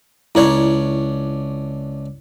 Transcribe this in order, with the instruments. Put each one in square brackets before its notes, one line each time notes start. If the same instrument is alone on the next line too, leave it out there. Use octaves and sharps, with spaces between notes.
[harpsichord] C#2 D4 C#5 [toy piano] E4 D5